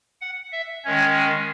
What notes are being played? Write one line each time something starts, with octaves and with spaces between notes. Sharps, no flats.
F#5
E5
D#3 G#3 C#4 C#5